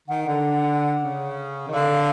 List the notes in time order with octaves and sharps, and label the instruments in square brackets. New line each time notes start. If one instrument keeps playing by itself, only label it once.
[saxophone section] D#3 [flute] F#5
[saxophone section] D3 [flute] F#5
[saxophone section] C#3
D#3
[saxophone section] D3 [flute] F5